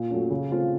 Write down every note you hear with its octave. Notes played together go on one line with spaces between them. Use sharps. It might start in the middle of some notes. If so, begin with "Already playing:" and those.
Already playing: A#2
F#3 A3 C#4
C#3
A3 C4 F4